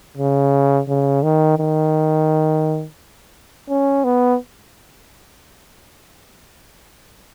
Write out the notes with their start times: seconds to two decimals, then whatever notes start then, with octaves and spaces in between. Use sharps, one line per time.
0.17 C#3
0.88 C#3
1.23 D#3
1.58 D#3
3.70 C#4
4.04 B3